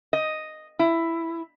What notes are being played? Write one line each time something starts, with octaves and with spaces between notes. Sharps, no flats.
D#5
E4